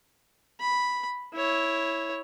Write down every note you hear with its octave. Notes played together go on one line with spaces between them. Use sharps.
B5
E4 C#5